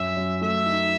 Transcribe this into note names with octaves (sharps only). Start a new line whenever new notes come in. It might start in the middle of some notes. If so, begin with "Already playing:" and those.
Already playing: F#2 C#4 E5
F#2
A3 E5
D#4